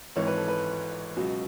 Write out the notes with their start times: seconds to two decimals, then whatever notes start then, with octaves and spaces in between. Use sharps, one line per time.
0.16 G#1 G#2 E3 C#5
0.27 B4
0.37 A4
0.48 B4
1.17 C#2 B2 F#3